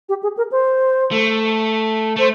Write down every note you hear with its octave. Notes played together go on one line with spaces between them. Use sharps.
G4
G#4
A#4
C5
A3
A3 C5